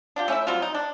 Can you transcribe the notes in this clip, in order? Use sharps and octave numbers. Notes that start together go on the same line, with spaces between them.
D4 F4 G4
A3 C#4 E4 E5
F#3 G3 C4 F4
D#4
D4